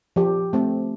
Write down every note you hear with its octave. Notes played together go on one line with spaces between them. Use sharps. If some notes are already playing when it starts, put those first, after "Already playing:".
F3 G4
A3 C4